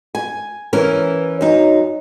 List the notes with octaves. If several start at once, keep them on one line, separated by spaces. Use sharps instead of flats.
G#5
E3 C#4 A#4
F#2 D#4